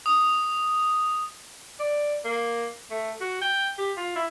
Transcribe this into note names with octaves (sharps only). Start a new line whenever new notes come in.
D#6
D5
A#3
A3
F#4
G5
G4
F4
E4